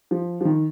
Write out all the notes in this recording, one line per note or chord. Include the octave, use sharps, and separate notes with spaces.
F3
F3
D#3